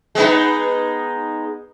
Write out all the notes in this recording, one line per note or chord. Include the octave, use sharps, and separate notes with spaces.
G#3 B3 D#4